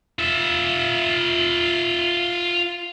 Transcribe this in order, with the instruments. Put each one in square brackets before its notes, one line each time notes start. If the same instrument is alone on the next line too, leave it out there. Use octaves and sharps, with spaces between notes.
[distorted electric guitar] F4 E5